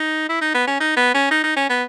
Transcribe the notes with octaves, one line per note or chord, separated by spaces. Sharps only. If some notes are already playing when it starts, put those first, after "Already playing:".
Already playing: D#4
E4
D#4
B3
C#4
D#4
B3
C#4
D#4
D#4
C#4
B3